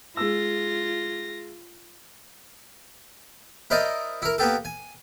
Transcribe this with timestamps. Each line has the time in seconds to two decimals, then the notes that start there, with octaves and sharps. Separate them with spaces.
0.17 G#3 F4 E6 A#6
3.70 E4 A#4 C5 D5 D#5
4.22 E4 A#4
4.38 A#3 B3 G4 A4
4.65 G#5